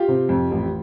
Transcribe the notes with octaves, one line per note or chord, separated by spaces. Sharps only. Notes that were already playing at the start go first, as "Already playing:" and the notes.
Already playing: F4 G4
C3
F2
A1